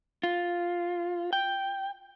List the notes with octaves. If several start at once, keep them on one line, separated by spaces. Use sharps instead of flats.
F4
G5